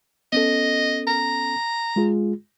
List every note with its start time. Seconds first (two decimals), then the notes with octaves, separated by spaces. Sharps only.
0.33 B3 C#4 A4 D#5
1.07 A#5
1.96 G#3 F4 G#4